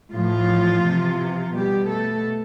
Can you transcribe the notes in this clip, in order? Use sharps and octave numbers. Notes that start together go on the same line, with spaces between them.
A2 E3 F3 F4
C3 E3
B2 G3 G4
A3 A4